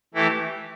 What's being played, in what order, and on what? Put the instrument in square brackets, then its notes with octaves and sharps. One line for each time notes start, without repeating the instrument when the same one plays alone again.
[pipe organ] E3 A3 E4 G4